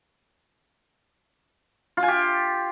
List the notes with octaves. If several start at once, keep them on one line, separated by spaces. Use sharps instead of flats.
F4
G#5
G4